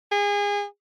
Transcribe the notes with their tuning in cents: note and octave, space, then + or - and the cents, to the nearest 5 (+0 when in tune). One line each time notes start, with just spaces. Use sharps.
G#4 -30